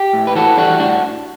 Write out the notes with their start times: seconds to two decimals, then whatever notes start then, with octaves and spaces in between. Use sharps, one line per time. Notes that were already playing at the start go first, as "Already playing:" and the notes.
Already playing: G4
0.13 A2
0.27 B4
0.35 E3 F#4 A4
0.57 G3 D4 F#4
0.79 A2 D4 F#4